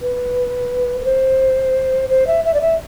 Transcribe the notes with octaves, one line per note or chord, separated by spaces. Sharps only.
B4
B4
C5
C5
E5
E5
D5
E5